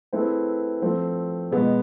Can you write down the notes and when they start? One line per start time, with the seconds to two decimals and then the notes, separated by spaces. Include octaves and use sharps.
0.13 A3 C4 E4 G#4 B4
0.82 F3 A3 C4
1.51 B2 G#3 B3